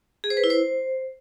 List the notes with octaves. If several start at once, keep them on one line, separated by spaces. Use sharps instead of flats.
G#4
C5
B4
E4
C5